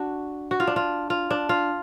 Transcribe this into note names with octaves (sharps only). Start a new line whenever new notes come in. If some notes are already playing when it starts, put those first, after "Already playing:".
Already playing: D4 F#4
F#4
F4
D4
F4
F4
D4
F4